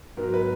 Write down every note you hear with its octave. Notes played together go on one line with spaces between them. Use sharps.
G#2 F#3 B3 A#4
B4